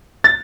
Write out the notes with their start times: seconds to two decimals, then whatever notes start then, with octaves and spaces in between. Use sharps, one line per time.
0.24 A6